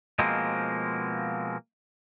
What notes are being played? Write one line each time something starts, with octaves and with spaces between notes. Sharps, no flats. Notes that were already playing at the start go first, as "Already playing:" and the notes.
B2 F3 G#3 A#3 C4